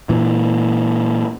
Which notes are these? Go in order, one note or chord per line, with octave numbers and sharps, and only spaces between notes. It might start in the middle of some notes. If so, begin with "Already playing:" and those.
A#2 E3